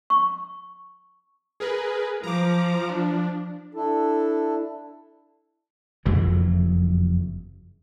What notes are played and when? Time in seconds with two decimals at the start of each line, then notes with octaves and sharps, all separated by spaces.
0.10 C#6
1.60 G#4 A#4 B4
2.24 F3 A#5 D6
2.89 D4
3.74 D4 E4 A4
6.05 F#1 F2 E3 F#3